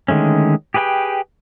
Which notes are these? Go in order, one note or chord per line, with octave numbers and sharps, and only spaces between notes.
D3 D#3 G#3 A3 C#4
G4 G#4 B4 D#5 G5